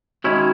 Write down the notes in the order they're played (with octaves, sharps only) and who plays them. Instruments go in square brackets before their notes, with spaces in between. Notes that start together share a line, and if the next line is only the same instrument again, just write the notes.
[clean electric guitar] D#3 G#3 C#4 E4 [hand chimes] F#4